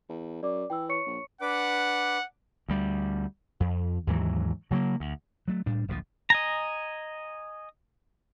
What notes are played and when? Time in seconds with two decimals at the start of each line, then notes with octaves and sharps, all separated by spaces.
0.09 E2
0.43 F#2 D5 D6
0.70 E3 G5 E6
0.89 C#5 C#6 C#7
1.06 A#1
1.41 D4 B4 F#5 D6
2.68 D2 G3
3.60 F2
4.07 D#2 G#2 E3 F#3
4.71 C#3 F#3 G#3 A#3
5.00 D2
5.48 F#3 A3
5.66 A2 G3 D4
5.88 D1 A#1 A2 F3
6.30 D#5 G#5 A#5